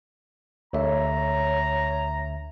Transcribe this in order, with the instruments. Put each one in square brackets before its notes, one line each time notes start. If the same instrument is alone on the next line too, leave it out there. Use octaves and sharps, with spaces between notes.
[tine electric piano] D2 D3 E5 [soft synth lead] C#5 [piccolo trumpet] A#5